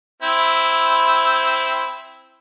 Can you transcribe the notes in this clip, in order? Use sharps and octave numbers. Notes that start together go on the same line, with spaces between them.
C4 E4